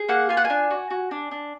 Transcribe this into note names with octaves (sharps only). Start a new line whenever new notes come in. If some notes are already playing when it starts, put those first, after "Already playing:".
Already playing: G#4
A#3 F#5
F4 G#5
F#5
G#5
D4
F#4
F#4
D4
D4